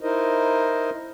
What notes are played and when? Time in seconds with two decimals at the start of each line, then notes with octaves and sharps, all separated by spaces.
0.01 D#4 E4 A#4 C5 D#5